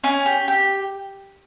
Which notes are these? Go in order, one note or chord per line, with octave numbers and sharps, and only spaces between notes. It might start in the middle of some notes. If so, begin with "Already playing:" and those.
C#4 G#5
G4
G4